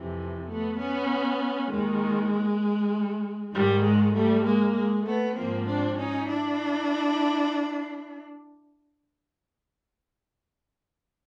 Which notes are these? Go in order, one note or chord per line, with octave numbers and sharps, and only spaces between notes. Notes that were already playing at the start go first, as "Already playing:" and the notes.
Already playing: F2 C3 E3
A3 B3
B3 C#4
D#2 D#3 G#3
G#2 D#3 G3
G#3
G3 A3
G#3 A#3
G#3
A3 B3
G#2 F3 A#3 C4
C4 D4
C#4 D#4
D4 E4